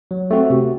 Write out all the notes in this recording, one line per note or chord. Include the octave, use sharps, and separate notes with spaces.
F#3
A3 C4 F#4
C3